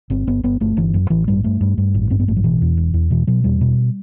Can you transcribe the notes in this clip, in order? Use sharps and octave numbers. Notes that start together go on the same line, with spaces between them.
G1 C4
G1 B3
G1 B3
G1 A3
G1 E3
F#2
A1 E3
G2 G3
G2 A3
G2
G2
A1
G2 C4
B3
A1 A3
F#3
B2 E3
E2
E1
E2
B2 E3
B2 F#3
E2 G3
B2